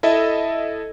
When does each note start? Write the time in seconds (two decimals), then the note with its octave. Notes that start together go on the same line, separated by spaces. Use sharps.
0.03 E4 A4 D#5 E5